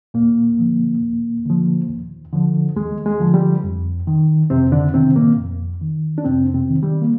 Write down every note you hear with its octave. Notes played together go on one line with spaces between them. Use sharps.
D#2 A#2 A#3
D3 F3
D#2
D3 F3
D#2
D3 F3
D#2 G#3
G#3
D3 F3
G3
F2
D#3
F2 C3 C4
D3 D4
C3 D#3 C4
A#2 A#3
F2
D#3
D4
F2 C3 C4
C3 C4
D#3
G3
A#3